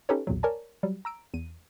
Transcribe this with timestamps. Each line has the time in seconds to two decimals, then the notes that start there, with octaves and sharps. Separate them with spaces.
0.09 C#4 D#4 G4 A4 B4 C#5
0.27 B1 E2 A#2 F#3
0.43 A#4 C#5 D5 G#5 A5
0.83 F#3 G3
1.05 A#5 E6 D7
1.34 E2 D#7